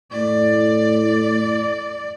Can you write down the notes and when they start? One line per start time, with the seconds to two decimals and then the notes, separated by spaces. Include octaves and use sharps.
0.12 A2 D5